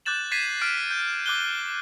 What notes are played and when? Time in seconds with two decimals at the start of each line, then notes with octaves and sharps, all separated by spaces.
0.05 D6 F#6 G6 A6 E7 F#7
0.31 G#6 A6 B6 C7 D#7 E7
0.61 F6 A6 D7
0.78 B6
0.91 G6
1.26 D6 F#6 G7